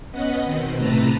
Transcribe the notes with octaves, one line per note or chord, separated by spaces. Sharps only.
B3 C#4 B4 D#5 F#5
B2 D#3 C4
A2 C3 A3 A4 B4 A#5